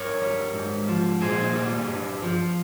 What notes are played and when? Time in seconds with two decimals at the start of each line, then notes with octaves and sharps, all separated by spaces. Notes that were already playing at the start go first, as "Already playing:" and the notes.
Already playing: G2 A#4 C#5
0.22 G3
0.55 G#2
0.88 F3
1.21 A#2 G#4 C5
1.55 G3
1.88 G2
2.22 F3